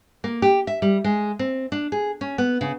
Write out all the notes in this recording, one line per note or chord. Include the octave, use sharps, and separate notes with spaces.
A#3
G4
E5
G3
G#3
C4
D4
G#4
C#4
B3
C#3